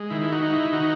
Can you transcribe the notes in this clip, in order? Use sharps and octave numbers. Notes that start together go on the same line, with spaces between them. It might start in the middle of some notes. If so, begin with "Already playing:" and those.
Already playing: G#3
D#3 E4
E4
D#4 F#4
D#4
E4
D#3 D#4 F#4